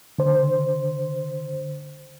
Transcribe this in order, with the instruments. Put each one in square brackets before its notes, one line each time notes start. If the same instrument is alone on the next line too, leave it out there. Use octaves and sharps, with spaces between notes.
[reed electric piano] D3 C5